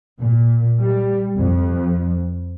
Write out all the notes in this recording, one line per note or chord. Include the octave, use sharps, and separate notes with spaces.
A#2
G3
F2